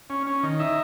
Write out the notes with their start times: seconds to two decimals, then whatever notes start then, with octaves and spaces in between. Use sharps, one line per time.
0.10 C#4
0.27 C#4
0.43 D#3
0.59 D#4 E5